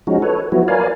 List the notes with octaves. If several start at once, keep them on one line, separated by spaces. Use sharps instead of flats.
F3 G#3 C#4 D#4 F#4
A4 B4 C#5
F3 F#3 B3 E4 F#4
A#4 B4 C#5 D5 F5 G#5